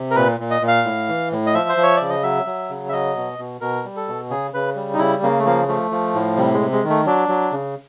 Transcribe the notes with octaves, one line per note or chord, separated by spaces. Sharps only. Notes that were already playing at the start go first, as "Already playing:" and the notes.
Already playing: C3
A#4
A#2 B4
A#2
D#5
A#2
F5
A2
E3
A2
D#5
F3 E5
C5
F3
C#5
C#3 D5
D#5
F#3 E5
F#3
C#3
E5
F#3 D#5
B2
B2
B2 A#4
G3
A4
B2
C#3 G#4
C#3 B4
G3
D#4
C#3 E4
C#3 A#3
A3
F3 A#3
F3 A3
F3
A2
C3 G3
G#3
C3
G#3
D#3
A3
F#3 D4
F#3
C#3